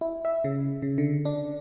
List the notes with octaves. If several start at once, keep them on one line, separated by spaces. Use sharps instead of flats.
E4
E5
C#3
C#3
D3
D4